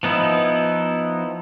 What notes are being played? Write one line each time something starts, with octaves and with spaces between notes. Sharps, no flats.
F3 B3 D#4 E4